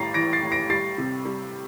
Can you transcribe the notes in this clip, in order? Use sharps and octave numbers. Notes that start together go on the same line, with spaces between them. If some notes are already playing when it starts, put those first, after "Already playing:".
Already playing: A2 G3 A#5 A6 C7
E3 A#6 D7
A6 C7
A2
A#6 D7
G3 A6 C7
C3
G3